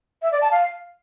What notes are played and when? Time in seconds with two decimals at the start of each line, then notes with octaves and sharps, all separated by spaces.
0.22 E5
0.32 D5
0.42 A5
0.51 F5